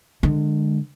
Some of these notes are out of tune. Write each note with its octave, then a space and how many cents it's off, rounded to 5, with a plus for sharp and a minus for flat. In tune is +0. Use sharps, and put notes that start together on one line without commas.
D3 +30 G#3 +0